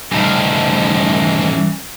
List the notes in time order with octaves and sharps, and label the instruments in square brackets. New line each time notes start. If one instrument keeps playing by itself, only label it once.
[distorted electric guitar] G2 C#3 [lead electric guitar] E3 A5 [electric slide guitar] A3 D#4